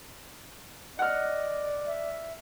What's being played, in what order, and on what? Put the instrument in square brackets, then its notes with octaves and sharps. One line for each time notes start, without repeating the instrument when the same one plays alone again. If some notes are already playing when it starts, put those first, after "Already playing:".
[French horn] D5 [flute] D#5 [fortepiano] F#5 F6
[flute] E5